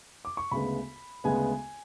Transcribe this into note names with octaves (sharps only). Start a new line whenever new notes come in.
D6
C#6
D2 C#3 G#3 B3 B5
D2 C#3 G#3 B3 G#5